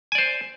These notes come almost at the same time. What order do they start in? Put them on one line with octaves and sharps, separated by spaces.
G#5 D5 C5